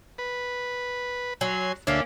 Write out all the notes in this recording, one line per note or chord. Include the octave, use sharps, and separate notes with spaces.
B4
F#3 G#5 C6
D2 A#3 C#4 D4 E5